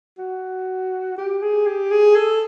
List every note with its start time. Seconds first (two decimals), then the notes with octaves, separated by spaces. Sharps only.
0.19 F#4
1.18 G4
1.42 G#4
1.67 G4
1.91 G#4
2.16 A4